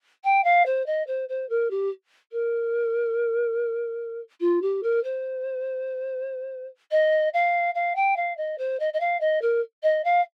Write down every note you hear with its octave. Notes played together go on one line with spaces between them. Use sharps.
G5
F5
C5
D#5
C5
C5
A#4
G4
A#4
F4
G4
A#4
C5
D#5
F5
F5
G5
F5
D#5
C5
D#5
D#5
F5
D#5
A#4
D#5
F5